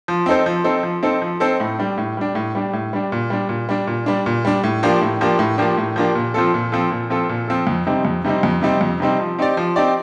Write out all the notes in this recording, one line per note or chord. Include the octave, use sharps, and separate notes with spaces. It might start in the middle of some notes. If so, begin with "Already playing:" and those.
F3
C4 D#4 A4 C5
F3
C4 D#4 A4 C5
F3
C4 D#4 A4 C5
F3
C4 D#4 A4 C5
A2
G3 D4
A2
G3 D4
A2
G3 D4
A2
G3 D4
A#2
G3 D4
A#2
G3 D4
A#2
G3 D4
A#2
G3 D4
A2
F3 A#3 D4 G4
A2
F3 A#3 D4 G4
A2
F3 A#3 D4 G4
A2
F3 A#3 D4 G4
A#2
F3 C4 F4 A4
A#2
F3 C4 F4 A4
A#2
F3 C4 F4 A4
A#2
F3 C4 F4 A4
F2
C3 G3 C4 D#4
F2
C3 G3 C4 D#4
F2
C3 G3 C4 D#4
F2
C3 G3 C4 D#4
F3
C4 D#4 G4 D5
F3
C4 D#4 G4 D5